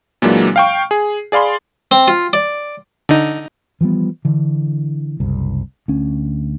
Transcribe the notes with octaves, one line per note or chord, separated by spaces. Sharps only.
A#2 E3 F#3 G#3 A#3 D4
F5 G5 C#6
G#4
G#4 D5 F5 B5 C6
C4
F4
D5
D3 D#4
E3 F3 G3 B3
D3 E3
F#1 C2
D2 C#4